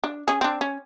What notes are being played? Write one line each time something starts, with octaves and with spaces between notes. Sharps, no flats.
D4
C#4 G#4
C4 D4
C#4